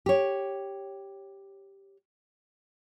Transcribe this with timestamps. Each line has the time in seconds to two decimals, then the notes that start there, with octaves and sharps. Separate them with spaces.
0.06 G4 C#5